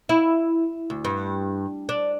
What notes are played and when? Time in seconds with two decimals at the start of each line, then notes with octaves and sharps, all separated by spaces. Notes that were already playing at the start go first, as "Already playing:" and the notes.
0.09 E4
0.90 D2
1.05 G2
1.89 D4